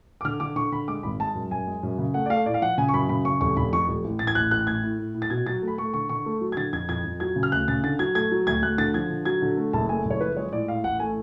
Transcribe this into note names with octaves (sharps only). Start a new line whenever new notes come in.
D6
D3 F6
D3 D6
D3 C#6
D3 B5
G#3 D6
G#1 B5
G#3 A5
F#2
F#2 G#5
G#3
F#2
C#3
A3 F#5
D5
A3 F5
A2 D5
F5
F3 F#5
C#3 G#5
C#6
F#2 B5
C#3 B5
C#3 C#6
F1 C#6
F1 B5
F2 C#6
F1
A1
A2 A6
G#6
A1 F#6
A1 F#6
A2 G#6
A2
A2
A2
A6
B2 G#6
F#3 A6
A3
B5
A3 C#6
D3 C#6
D3 C#6
A3
F#3
G#6
D3 A6
F2 G#6
F2 G#6
F2
F#3 G#6
C#3
F6
D2 F#6
C#3 A6
D3 A6
F#3 G#6
A3 G#6
F#3
D2 G#6
D2 F#6
D3 A6
F3 G#6
D3
F#3 G#6
D3
A3
F#1 A5
A3 G#5
F#1
C#5
F3 B4
G#3 C#5
A2 D5
A2 F5
A1 F#5
A3 G#5